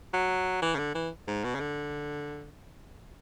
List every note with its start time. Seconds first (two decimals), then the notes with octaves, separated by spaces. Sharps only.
0.13 F#3
0.62 E3
0.75 C#3
0.78 D3
0.95 E3
1.27 G#2
1.44 B2
1.55 C#3
1.60 D3